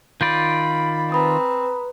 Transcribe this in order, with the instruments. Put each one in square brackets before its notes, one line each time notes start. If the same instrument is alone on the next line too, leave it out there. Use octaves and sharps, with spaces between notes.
[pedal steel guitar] D#3 F4 D5 [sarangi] B5 [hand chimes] G6
[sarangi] C4 [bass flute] B4 [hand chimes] A#5 B5 D#6